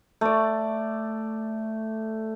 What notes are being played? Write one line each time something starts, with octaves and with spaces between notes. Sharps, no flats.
A3 D5